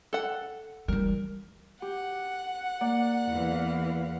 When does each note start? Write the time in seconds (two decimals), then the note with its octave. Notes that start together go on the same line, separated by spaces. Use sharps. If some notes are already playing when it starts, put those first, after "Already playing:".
0.13 A4 F#5
0.88 E3 G3 A#4
1.82 G4 F#5
2.81 A#3 D5
3.27 E2 E3 F5